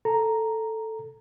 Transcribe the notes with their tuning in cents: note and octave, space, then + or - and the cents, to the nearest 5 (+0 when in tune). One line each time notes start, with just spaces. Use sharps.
A4 +0 A#5 +0